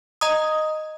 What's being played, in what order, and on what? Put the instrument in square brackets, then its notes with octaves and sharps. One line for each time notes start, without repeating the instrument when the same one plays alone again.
[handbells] D#5 A#5 D#6